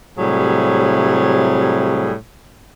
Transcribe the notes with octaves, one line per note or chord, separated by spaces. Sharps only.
A2 C3 F#3 G3 G#4